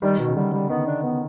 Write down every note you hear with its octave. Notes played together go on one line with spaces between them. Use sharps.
D#3 G3
B2
C#3
D3 G3
G3
D#3 B3
D4
B3